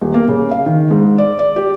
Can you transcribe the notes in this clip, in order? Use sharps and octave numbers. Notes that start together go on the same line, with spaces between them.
D#1
A#3
C#3
F5
D#3
G#2
D5
D5
G4